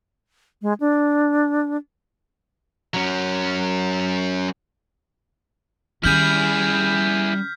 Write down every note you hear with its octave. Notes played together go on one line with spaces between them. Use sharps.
G#3
D4
F#3 C#4
D#3 G3 C#4 E4 G#4 F6 G6 B6